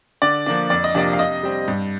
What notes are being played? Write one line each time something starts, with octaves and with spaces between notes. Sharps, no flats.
D3 D5
F3 A#3 D4
F2 D5
D#5
C3 F3 A#3 D4 D5
F5
C3 D#5
G3 C4
G2